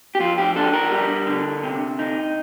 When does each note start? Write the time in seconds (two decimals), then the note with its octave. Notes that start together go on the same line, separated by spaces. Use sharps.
0.15 G4
0.20 F2 F4
0.38 G4
0.56 D4 A4
0.74 A#4
0.91 G3
1.27 D3
1.63 C3
1.99 D#4